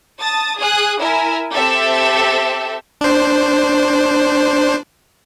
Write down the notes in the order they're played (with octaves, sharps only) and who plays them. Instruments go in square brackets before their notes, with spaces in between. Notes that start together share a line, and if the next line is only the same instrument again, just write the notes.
[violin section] A5 D#6 A6
G#4 D#6 F#6
E4 A#4 E5 G#5
C4 G4 A4 E5
[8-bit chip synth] D4 C5